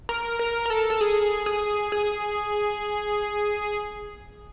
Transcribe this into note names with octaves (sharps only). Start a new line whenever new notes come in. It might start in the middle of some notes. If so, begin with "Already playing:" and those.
A#4
A#4
A#4
A4
A4
G#4
G#4
G#4